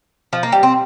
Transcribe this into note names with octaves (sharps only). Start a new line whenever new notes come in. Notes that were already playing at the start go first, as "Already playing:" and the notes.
F3
A#3
G3
C4